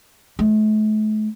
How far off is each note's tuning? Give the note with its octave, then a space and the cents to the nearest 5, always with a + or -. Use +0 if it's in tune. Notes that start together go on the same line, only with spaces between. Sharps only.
A3 -40